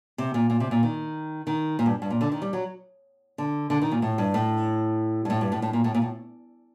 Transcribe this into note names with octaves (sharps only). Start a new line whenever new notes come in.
C3
A#2
A#2
C3
A#2
D#3
D#3
A#2
G2
G2
A#2
D3
D#3
G3
F#3
D3
D3
D#3
A#2
A2
G2
A2
G2
A2
G2
A2
A2
A#2
A2
A#2
A2